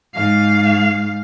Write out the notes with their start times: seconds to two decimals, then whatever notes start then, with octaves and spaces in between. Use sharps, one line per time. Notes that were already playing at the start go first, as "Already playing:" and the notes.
0.15 G#2 F5